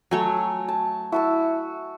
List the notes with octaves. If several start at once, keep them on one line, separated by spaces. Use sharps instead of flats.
F#3 A3 C#5 G#5
A5
E4 F#4 A5 E6